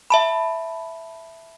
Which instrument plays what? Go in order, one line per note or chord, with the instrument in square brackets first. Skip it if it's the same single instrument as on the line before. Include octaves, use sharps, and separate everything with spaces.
[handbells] E5 A5 B5